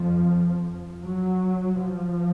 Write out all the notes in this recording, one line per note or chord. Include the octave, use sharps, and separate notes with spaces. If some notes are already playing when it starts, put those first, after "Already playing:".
Already playing: F2 F3
F#3
F3